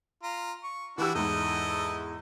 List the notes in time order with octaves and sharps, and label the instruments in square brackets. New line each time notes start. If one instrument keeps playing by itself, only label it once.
[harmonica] F4 A#5
C#6
[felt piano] E3 G4 E6 [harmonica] D4 E4 F#4
[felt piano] E2 G#2 [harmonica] E4 A4 D#5